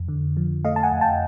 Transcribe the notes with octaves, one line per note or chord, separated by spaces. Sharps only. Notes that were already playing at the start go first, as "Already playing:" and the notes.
Already playing: F2
D3
F3
A3 D#5 F5
A5
F#5 G#5
F2
G5 A5